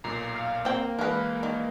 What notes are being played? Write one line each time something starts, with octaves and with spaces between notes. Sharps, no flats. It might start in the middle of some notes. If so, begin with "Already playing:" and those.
B1 A#2 A#5 C7
F5
A#3 C4 G5
E3 G#3 A#4 B4
D#3